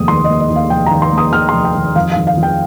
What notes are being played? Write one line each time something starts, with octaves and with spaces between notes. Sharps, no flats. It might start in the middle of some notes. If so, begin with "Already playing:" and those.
Already playing: F1 D#2 A#3 D#6
D#3 C6
D#5
A#3
D#5
D#2
F5
F1 G5
A#5
D#3
C6
A#3
D#6
D#2 F6
C6
F1
G5
D#3
F2 F5
F5
D#3
F5
F2
G5